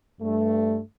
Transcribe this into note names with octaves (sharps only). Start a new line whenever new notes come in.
G2 A3